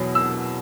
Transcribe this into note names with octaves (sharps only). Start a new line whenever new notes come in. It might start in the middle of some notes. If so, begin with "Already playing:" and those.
Already playing: E2 B2 F#3
E6